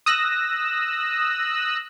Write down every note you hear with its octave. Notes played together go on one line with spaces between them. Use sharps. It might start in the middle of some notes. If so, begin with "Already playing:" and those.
D#6 E6 F#6 A#6